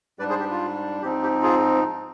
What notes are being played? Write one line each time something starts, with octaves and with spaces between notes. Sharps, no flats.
G#2 G3 D4 B4 D5
G#4 C5
G4
F4
G#2 F3 C4 D#4 G4
G4
F4 G#4